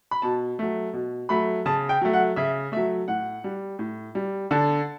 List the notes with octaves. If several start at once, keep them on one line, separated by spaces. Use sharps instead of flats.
B5
B2 A5
F#3 A3
B2
F#3 A3 B5
C#3 A5
G5
F#3 A3
F#5
C#3 E5
F#3 A3 E5
A2 F#5
G3
A2
G3
D3 A5